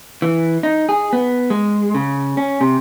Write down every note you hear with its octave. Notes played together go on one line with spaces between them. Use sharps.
E3
D#4
G#4
B3
G#3
C#3
C#4
C3